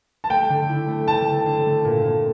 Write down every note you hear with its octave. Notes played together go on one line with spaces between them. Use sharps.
A5
A3 G5
D3
E4
A3
D3 A5
A3
D3
A3
A#2
A#2